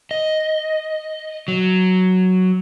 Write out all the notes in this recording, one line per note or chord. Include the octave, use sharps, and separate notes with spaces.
D#5
F#3